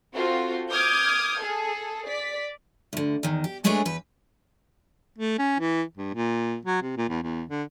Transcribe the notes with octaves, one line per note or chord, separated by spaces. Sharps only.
C4 F4 F#4 A4 C5
D6 D#6 F6 G6 G#6
G#4 A4
D5 B6
D2 D3
E2 D#3
G4
G#3 A3 D4 G#4 B4 C#5
E2 B4
A3
C#4
E3
G2
A#2
F#3
C3
A#2
E2
E2
D3